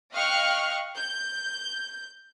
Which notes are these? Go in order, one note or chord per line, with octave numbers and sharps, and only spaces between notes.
D#5 F5 G5 C#6 F6 F#6
G6